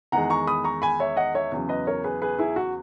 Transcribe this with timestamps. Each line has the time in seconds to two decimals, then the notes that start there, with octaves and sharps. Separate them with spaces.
0.12 E2 D#3 G#3 F#5 A#5
0.30 A#5 C#6
0.47 B5 D#6
0.64 A#5 C#6
0.82 G#5 B5
1.00 C#5 E5
1.16 D#5 F#5
1.34 C#5 E5
1.52 E2 C#3 F#3
1.69 B4 D#5
1.87 A#4 C#5
2.04 G#4 B4
2.22 G#4 B4
2.38 E4 G#4
2.56 F#4